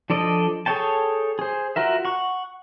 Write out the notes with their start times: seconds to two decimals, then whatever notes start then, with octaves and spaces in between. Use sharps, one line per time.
0.10 F3 D4 A4 D5 D#5
0.66 G#4 A4 C#5 G5 A5
1.39 G#4 C5
1.76 F4 F#4 A#4 E5
2.05 F#5 C#6